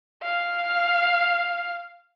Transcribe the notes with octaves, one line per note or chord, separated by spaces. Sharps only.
F5